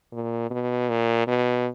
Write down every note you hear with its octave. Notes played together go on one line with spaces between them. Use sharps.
A#2
B2
A#2
B2